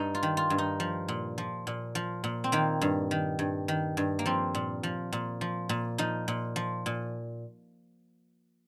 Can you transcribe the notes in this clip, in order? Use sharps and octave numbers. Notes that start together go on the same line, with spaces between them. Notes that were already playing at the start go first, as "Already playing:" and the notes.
Already playing: G2 D#4
F4
D#3
F4
G2
D#4
F3
A#2
F3
A#2
F3
A#2
C4
D#3 A#3
G2
D#3
G2
D#3
G2
A#3
F3 C4
A#2
F3
A#2
F3
A#2
F3 D#4
A#2
F3
A#2